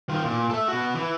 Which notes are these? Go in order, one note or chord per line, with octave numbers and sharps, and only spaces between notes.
D#3 F4
A#2
A4 E5
B2 F#4
E3